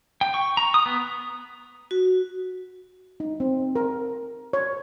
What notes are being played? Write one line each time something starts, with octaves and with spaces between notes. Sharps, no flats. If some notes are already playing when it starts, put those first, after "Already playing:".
G5
C#6
A#5
D#6
B3
F#4
D#4
C4
A#4
C#5